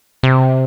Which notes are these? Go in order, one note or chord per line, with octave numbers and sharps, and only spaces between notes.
C3